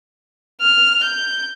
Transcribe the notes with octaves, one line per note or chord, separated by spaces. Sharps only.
F6
G6